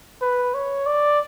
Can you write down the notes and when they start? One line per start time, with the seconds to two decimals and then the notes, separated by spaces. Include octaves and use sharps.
0.22 B4
0.54 C#5
0.86 D5